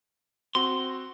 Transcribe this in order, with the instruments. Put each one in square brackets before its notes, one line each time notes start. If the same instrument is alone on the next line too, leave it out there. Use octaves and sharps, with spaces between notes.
[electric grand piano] C4 F#4 [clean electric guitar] C6